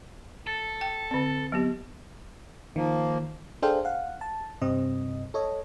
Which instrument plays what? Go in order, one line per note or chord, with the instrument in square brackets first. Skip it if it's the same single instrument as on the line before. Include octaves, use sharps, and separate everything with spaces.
[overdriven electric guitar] A4
[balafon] G5
D3 C4
F#3 B3 G4
[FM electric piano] D#3 [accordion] F3 A#3
[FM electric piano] D4 G#4 A4 C5 F5 G5
F5 F#5
A5
G2 C3 C4 D#5
A4 C#5 D#5